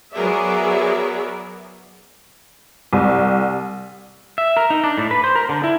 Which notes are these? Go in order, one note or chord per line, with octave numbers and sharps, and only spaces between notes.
F#3 B3 G#4 A#4 D5 E5
C2
E5
A#4
D#4
D4
A2
B4
C5
A#4
D3
E4